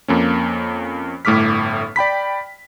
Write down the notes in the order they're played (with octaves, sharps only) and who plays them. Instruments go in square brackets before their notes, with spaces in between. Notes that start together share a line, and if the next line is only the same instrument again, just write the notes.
[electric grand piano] F2 A#3 C#4
G1 A2 A3 D6 F6 B6
D5 G5 B5 B6